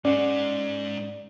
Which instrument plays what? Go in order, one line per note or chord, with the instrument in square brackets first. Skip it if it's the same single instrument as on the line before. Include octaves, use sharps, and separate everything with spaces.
[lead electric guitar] G#2 G#3 [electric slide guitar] C#4 F#5 [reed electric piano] D5